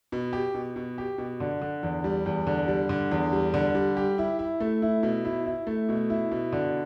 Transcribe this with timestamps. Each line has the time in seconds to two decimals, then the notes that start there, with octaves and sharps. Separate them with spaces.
0.12 B2
0.33 G4
0.54 B2
0.76 B2
0.98 G4
1.18 B2
1.40 D3
1.62 D3
1.83 E2
2.04 G3
2.26 E2
2.47 D3
2.68 G3
2.89 D3
3.11 E2
3.33 G3
3.54 D3
3.75 G3
3.97 G4
4.18 E4
4.39 E4
4.60 A3
4.82 E4
5.03 B2
5.25 E4
5.46 E4
5.67 A3
5.89 B2
6.10 E4
6.31 B2
6.53 D3